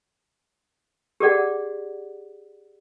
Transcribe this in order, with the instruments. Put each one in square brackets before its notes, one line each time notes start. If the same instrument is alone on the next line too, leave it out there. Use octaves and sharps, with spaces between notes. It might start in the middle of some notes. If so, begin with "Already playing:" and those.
[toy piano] G4 G#4 D5 F#5